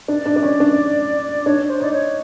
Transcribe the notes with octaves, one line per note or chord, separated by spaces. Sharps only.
D4 D5
D4
D4
C#4
D4
D4 C#5
C5
D#4 D5
C#5